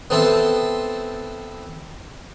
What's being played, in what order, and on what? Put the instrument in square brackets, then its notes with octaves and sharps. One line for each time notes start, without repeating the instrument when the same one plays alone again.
[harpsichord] B3 C4 A4 C5 E5 A5